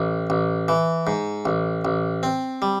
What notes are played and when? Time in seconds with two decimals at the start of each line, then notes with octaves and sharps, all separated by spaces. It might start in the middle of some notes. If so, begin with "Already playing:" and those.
Already playing: A1
0.30 A1
0.68 E3
1.07 G#2
1.45 A1
1.85 A1
2.23 C4
2.62 G3